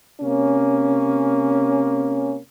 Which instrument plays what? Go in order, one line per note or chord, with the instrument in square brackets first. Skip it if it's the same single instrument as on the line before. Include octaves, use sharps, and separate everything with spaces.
[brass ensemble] C3 A#3 C#4